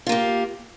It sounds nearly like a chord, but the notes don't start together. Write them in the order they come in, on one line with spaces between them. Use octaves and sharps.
F4 A#3 G4